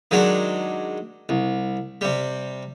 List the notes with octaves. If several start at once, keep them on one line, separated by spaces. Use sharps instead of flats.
D#3 F#3 G#3 D4
C2
C3 G3